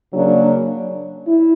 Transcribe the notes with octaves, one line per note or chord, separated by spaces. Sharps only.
C#3 F#3 A#3 D4
E4